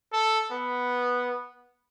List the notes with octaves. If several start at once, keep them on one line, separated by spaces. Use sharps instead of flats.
A4
B3